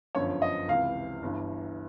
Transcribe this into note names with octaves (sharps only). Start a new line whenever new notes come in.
G1 F#2 D3 F3 C#5
D#5
C#2 C3 E3 F5
G1 G2 E3